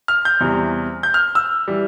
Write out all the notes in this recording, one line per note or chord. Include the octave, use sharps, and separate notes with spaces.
F6
G6
E2 C3 E3 G3
G6
F6
E6
E3 G3